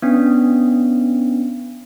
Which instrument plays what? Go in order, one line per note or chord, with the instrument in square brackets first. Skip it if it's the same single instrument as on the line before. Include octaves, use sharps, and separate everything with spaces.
[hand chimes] B3 C#4 D4